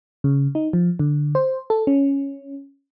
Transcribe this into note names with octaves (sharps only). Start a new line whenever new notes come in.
C#3
D#4
F3
D3
C5
A4
C#4